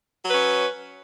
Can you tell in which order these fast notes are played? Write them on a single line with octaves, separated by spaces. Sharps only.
F#3 B4 C#4